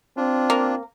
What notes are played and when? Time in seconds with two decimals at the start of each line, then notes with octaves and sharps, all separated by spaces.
0.17 C4 D4 F4
0.50 A#3